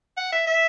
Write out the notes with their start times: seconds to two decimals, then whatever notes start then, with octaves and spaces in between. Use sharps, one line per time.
0.17 F#5
0.32 E5
0.47 E5